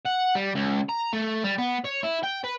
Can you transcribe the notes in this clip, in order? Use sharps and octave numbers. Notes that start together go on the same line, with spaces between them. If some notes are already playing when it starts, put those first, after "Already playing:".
F#5
G3
C#2
A#5
A3
G3
B3
C#5
E4
G5
B4